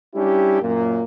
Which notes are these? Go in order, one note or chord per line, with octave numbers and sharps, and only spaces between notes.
G3 C#4 D4 E4 G4
F#2 A#2 A#3